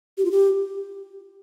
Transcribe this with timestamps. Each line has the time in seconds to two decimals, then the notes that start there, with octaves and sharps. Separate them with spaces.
0.18 G4
0.25 F4
0.31 G4